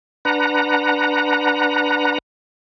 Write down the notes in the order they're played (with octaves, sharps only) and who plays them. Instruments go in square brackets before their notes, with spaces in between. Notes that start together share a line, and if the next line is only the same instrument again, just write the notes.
[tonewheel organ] D4 B4 F#5 A#5